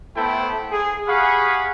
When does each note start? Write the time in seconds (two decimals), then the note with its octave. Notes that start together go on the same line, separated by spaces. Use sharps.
0.15 A3 B3 E4 A4 C5 G5
0.71 G#4
1.07 G4 G#4 F5 F#5 B5 C#6